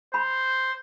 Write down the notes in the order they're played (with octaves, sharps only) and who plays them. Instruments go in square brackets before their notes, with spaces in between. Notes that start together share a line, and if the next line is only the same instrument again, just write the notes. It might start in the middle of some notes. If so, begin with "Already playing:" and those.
[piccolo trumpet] C5 [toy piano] B5